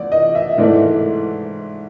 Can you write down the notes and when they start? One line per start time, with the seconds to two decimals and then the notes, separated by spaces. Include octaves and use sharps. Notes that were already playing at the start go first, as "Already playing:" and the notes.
Already playing: A1 D5
0.12 D#5
0.35 E5
0.58 G#2 E3 A3 D5